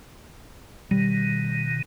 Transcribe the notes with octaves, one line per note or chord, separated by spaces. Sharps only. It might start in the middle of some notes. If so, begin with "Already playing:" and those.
B2 D#3 G3